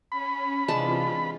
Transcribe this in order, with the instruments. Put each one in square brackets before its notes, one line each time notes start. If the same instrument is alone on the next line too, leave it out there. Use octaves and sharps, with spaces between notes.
[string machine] C#4 [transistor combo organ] B5
[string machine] C3 E3 F4 [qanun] G#3 D4 A5